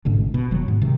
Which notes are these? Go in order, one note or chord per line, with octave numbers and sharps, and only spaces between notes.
A1 G#2 B2 D3
B2
F#1 D#3 F#3
G#2
C3 D#3